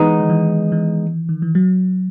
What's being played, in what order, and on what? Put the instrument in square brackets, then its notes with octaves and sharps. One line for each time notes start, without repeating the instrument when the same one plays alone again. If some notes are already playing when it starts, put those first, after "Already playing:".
Already playing: [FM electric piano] E3 [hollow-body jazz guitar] G#3 B3 D#4
[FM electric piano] D#3
E3
E3
D#3
E3
F#3